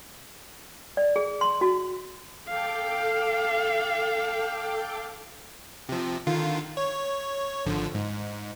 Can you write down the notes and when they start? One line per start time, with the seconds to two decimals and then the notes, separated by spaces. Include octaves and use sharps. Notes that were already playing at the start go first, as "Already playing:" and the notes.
0.97 D5
1.16 G#4
1.41 C6
1.61 F#4
2.48 A4 F5 G5 D6
5.89 C3 F3
6.27 D3 D#3 F4
6.77 C#5
7.66 G#1 D3 F3
7.95 G#2